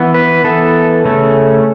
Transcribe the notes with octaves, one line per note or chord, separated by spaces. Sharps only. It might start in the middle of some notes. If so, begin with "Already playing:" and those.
Already playing: E3 B3
B4
E3 B3 A4
C#3 A3 C#4